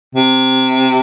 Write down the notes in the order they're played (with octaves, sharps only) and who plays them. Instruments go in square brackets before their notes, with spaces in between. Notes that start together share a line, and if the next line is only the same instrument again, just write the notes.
[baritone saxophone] C3